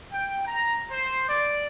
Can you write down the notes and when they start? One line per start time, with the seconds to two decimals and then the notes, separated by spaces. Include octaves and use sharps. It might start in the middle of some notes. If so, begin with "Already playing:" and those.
0.12 G5
0.46 A#5
0.91 C5
1.28 D5